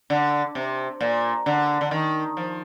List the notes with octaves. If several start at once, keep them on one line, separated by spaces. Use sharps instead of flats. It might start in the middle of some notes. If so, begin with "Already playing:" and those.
D3
C3
A#2
D3
D3
D#3
F3